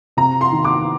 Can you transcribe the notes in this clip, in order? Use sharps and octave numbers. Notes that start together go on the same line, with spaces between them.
C3 A#5
C6
D#3
D6